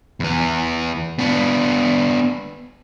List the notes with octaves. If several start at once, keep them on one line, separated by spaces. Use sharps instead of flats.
E2 B3
B3 D4